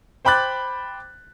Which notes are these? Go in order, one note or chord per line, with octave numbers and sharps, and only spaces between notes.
C5 G5 B5 D6 F#6 A6